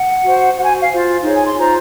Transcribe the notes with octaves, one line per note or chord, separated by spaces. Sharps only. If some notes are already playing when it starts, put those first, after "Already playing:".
Already playing: F#5
F#4 C5
F#4 C5 F#5
G#5
F5
F4 C5
D#4 G#4 C#5
G#5
C6
F4 C5 A#5